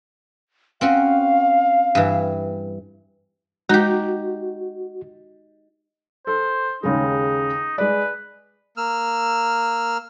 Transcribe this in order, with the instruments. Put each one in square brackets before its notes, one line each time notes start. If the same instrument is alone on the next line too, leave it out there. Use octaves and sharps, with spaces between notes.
[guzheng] C4 C#4 F#4 [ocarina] F5
[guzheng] G2 E3
[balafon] G#3 A#5 [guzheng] D#4 G4 [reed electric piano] F#4
[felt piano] A4 [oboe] C5
[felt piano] D#2 C#3 G#3 [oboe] D#4
[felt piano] G#3 D5 [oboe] B4
[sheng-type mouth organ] A#3 E6 F6